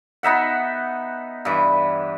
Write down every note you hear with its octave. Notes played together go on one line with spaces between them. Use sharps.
B3 D#4 E5 F#5
G2 E3